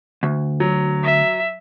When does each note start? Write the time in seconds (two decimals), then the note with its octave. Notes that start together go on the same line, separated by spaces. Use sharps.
0.23 D2
0.60 F#3
1.03 E5